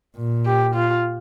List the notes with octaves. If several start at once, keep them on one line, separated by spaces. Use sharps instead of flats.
A#2
G4
F4